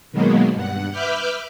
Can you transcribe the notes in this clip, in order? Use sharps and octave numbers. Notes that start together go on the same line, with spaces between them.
B2 D#3 F#3 G#3 A#3 B3
G2 F#5
B4 E5 B5 D6 F6 G6